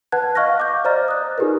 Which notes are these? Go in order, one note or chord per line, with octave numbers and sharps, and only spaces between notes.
B4 F#5 A5 F#6 G#6
D#5 F5 C#6 F6 F#6 A#6
D6 G6
C5 D5 D#5 A#5 F6 A6
D#6 F#6
D#4 F4 G4 G#4 A#4 B4